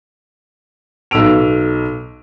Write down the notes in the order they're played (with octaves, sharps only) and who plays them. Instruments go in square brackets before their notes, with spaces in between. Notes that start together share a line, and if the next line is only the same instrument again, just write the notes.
[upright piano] B1 A4 E6 D7 F7